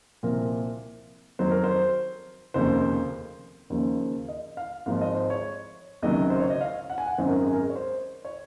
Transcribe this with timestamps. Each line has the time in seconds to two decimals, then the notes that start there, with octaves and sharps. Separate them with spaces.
0.23 C2 A#2 F3 A#4
1.39 F2 D#3 F#3 C5
1.51 A#4
1.64 C5
2.54 F1 D#2 C#3 F3 C5
3.70 D#2 C#3 F3
4.28 D#5
4.57 F5
4.86 G#1 G#2 F3 F5
5.01 D#5
5.15 C5
5.30 C#5
6.02 C#2 C3 D#3 F#3 D#5
6.30 C5
6.40 C#5
6.50 D#5
6.61 F5
6.90 F#5
6.98 G#5
7.06 F#5
7.18 G#1 F#2 D#3 F#3 C5
7.29 A#4
7.41 G#4
7.53 A#4
7.70 C#5
7.76 C5
8.25 C#5